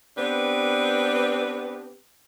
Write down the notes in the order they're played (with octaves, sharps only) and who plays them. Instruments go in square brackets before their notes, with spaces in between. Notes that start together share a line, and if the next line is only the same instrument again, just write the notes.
[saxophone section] B3 C4 D4 G4 B4